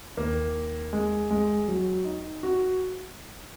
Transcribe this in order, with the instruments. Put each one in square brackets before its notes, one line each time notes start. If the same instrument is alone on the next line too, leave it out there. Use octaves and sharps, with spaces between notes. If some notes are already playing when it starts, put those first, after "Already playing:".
[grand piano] D#2 D#3 A#3
G#3
G#3
F#3
D#4
F#4